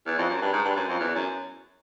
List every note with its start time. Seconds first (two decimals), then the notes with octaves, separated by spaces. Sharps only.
0.06 E2
0.18 F2
0.30 F#2
0.41 G2
0.53 G#2
0.65 G2
0.76 F#2
0.88 F2
1.00 E2
1.15 F#2